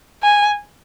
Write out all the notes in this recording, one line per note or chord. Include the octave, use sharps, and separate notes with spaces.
G#5